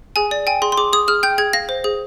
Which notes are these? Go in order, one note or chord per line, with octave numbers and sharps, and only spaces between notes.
G#4 G#5
D5
G5 G#5
G#4 C6
C6
G#4 D6
G#4 D#6
G#4 F6
G5 G6
G#4 G#6
F5 A#6
C5
G#4